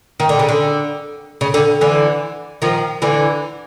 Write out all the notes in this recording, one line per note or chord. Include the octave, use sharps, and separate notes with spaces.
D#3
D3
C#3
D3
C#3
D3
D3 E3
D#3 F3
D3 E3